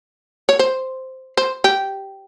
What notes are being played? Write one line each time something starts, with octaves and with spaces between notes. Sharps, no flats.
C#5
C5
C5
G4